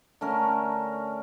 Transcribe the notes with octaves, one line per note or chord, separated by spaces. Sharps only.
D3 A3 C#4 A#4